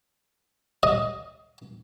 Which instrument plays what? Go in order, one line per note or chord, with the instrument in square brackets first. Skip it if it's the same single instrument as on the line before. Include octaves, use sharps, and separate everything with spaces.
[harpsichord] D#5